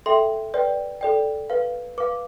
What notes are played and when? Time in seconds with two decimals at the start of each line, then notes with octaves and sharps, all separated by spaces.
0.06 A4 E5 G5 C6
0.54 B4 D5 G5
1.01 A4 D5 G5
1.50 B4 F5
1.98 B4 F5 D6